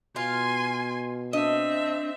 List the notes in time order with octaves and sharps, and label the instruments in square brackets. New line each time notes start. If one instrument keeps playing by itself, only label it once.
[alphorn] B2 [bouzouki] F4 [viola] G#5 C6
[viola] C4 E5 [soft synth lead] D4 [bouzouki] D#5